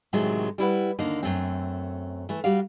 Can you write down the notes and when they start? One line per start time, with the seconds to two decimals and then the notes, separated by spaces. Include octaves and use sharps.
0.13 A2 C3 D#3 F#3 G#3 A3
0.58 G3 E4 B4 F#5
0.99 D#2 D3 A#3 D#4
1.23 F#2 A3 C4
2.29 E3 A3
2.44 G3 F#4 G4 F5